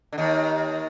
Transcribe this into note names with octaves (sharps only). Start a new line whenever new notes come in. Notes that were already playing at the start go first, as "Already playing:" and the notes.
D3
D#2 D#3